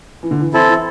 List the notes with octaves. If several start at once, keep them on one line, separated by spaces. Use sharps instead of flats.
E3
D3
E3
E3 C4 E4 A4
E3